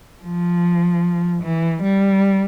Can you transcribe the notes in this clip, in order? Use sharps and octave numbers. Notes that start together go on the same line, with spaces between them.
F3
E3
G3